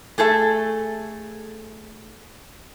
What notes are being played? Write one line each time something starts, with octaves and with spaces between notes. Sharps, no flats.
A3 G#4 A4 E5